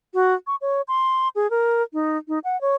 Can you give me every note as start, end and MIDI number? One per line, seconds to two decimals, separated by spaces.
0.14 0.34 66
0.47 0.56 85
0.61 0.82 73
0.88 1.29 84
1.36 1.50 68
1.51 1.83 70
1.93 2.17 63
2.28 2.39 63
2.44 2.59 78
2.61 2.76 73